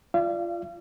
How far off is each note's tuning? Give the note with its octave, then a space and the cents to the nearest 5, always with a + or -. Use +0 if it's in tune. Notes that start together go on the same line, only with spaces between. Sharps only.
F4 -15 D5 +0 F5 -40